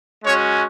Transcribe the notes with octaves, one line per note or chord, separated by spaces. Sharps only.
G#3 C#4 F#4 C#5